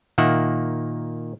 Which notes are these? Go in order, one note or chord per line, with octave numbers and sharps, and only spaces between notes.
A#2 D#3 A#3 E5 F#5